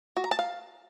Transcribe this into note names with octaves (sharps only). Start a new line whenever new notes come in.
F#4
A#5
A5
F5